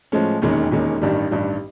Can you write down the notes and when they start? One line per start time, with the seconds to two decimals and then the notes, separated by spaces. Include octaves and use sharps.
0.12 A2 F3 G#3 C#4
0.42 E1 D#2 D#3 G#3 C#4
0.71 E1 D#2 D#3 G#3 C#4
1.01 A1 G2 D#3 G3
1.31 A1 G2 D#3 G3